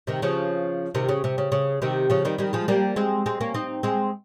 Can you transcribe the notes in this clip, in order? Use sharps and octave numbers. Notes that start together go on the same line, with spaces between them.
C3 D#3
C#3 F3
C3 D#3
C#3
C3
C#3
C#3
C3 D#3
C#3 F3
D#3 G3
D#3 G3
F3 G#3
G3 A#3
G#3 C4
G#3 C4
A#3 C#4
C4 D#4
G#3 C4